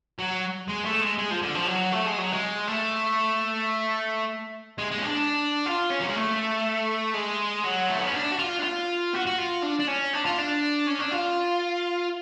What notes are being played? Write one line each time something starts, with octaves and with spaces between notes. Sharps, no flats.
F#3
G#3
A3
G#3
G#3
F3
D3
F3
F#3
A3
G#3
F#3
G#3
A3
G#3
G#3
C#4
D4
F4
C#4
F#3
G#3
A3
G#3
F#3
A3
B3
C#4
D4
F#4
F4
D4
F4
F#4
F#4
F4
D4
D4
C#4
D4
F4
D4
C#4
D4
F4